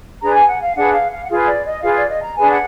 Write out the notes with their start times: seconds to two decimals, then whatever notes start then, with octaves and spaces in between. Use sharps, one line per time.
0.21 D4 G#4 B4 A#5
0.34 G#5
0.47 F#5
0.61 F5
0.75 D4 G#4 B4 F#5
0.93 F5
1.11 F5
1.24 F#5
1.29 F4 G#4 B4 F5
1.46 D5
1.65 D#5
1.82 F4 G#4 B4 F5
1.96 D5
2.10 D#5
2.23 A#5
2.36 D4 G#4 B4 G#5
2.50 F#5